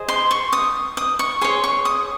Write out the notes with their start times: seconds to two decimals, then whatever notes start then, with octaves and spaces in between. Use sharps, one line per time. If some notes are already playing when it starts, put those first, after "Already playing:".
Already playing: G#4 C5 D#5
0.08 C6
0.31 C#6
0.53 D#6
0.97 D#6
1.19 C#6
1.41 G#4 C#5 C6
1.64 C#6
1.85 D#6